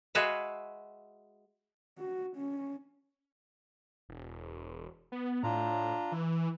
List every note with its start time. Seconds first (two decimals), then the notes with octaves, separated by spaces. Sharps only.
0.15 G#3 F#4 G#4 B4 E5 F5
1.98 F#4
2.36 C#4
4.09 E1
5.12 B3
5.43 A2 D4 F4 A#5
6.12 E3